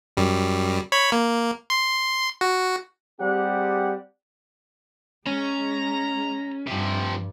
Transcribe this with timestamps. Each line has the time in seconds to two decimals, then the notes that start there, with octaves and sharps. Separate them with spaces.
0.17 F#2 G3
0.92 C#5 B5
1.12 A#3
1.70 C6
2.41 F#4
3.20 G3 C4 G4 G#4 F#5
5.27 G#3 C#4 A#5
6.67 G2 C3 F3